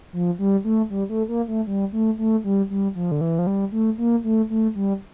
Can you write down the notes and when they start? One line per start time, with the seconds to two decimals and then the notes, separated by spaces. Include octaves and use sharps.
0.13 F3
0.39 G3
0.64 A3
0.90 G3
1.09 A3
1.28 A#3
1.48 A3
1.67 G3
1.93 A3
2.18 A3
2.44 G3
2.70 G3
2.95 F3
3.11 D3
3.21 E3
3.39 F3
3.47 G3
3.72 A3
3.98 A#3
4.24 A3
4.50 A3
4.75 G3